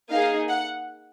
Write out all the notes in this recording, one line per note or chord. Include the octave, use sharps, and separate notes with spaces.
A#3 D#4 G#4 F5
F#5